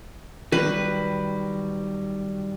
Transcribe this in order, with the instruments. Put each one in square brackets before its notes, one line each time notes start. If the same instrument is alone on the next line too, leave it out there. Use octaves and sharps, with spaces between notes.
[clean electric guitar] D#3 F#3 G3 [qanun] B4